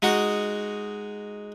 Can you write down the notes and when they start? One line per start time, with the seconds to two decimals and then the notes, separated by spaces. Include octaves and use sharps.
0.02 G#3 D#4 F#4